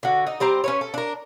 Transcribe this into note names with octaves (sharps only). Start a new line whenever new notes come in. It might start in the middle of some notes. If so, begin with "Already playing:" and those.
D3 F#4
D#4
G3 C4 C5 A#5
C#4 B4 C#5
A4
D4 A#4